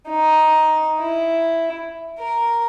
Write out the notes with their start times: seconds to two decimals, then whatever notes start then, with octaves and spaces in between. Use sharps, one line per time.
0.11 D#4
0.99 E4
2.20 A#4